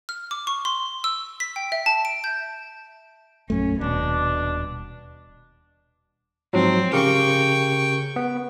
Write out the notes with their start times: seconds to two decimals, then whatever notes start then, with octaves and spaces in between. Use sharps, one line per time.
0.09 F6
0.31 D6
0.47 C#6
0.65 C6
1.04 E6
1.40 B6
1.56 G5
1.72 E5
1.86 A5
2.05 D7
2.24 G6
3.50 A#1 F#2 A3 C#4
3.81 D#1 B2 D4
6.53 G#2 F3 F#3 C4
6.93 C#3 G4 A#4 G5 C#6
8.16 B3